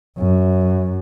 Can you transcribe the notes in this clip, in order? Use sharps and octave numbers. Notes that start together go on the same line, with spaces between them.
F#2